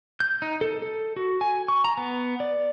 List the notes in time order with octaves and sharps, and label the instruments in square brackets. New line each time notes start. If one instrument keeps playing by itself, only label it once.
[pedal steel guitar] G6
D#4
A4
A4
F#4
G#5
C#6
A#5
B3
D5